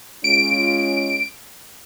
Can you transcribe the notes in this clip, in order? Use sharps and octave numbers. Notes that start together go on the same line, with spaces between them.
G#3 C#4 F4 D7